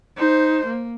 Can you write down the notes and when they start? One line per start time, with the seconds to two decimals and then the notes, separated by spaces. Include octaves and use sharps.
0.17 D#4 C5
0.66 A#3